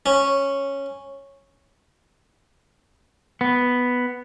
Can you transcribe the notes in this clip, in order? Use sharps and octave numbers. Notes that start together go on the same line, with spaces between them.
C#4
B3